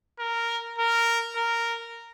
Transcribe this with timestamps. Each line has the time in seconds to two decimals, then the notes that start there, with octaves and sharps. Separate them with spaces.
0.19 A#4
0.78 A#4
1.36 A#4